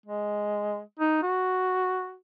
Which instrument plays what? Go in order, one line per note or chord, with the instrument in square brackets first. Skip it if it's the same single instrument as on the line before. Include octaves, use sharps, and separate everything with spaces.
[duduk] G#3
D#4
F#4